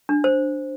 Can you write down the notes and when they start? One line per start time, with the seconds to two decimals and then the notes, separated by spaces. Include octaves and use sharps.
0.09 D4
0.24 C5